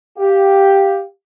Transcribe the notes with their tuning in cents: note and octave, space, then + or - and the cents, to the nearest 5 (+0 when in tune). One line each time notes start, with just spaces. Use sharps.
G4 +0 F5 +0